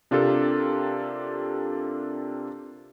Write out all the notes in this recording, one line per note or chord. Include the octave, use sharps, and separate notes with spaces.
C3 D4 F4 G4 A4 A#4